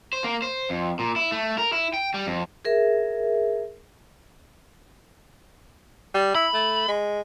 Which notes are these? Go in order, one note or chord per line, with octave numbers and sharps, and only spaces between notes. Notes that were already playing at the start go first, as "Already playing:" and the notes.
C5
A#3
C5
F2
A#2
E4
A3
A#4
E4
G5
G3
F2
G#4 A#4 E5
G3
E4 B5
A3
G#3